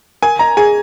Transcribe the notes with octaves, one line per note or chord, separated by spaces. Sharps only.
A#4 G#5
D#5 A#5
G#4 G#5